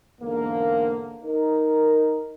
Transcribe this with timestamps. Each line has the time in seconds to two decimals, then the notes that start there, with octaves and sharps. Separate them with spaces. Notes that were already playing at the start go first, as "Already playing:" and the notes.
0.21 E2 G#2 D3 A#3
1.24 D#4 A#4